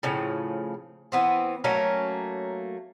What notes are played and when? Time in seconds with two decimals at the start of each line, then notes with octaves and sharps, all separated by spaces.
0.03 A2 C#3 F3
1.12 E3 B3 C4
1.64 F#3 A3 A#3 C#4